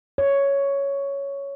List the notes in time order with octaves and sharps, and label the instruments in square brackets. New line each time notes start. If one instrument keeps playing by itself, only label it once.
[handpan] C#5